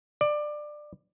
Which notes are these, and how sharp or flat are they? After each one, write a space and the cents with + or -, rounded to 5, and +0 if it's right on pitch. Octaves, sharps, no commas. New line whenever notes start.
D5 +20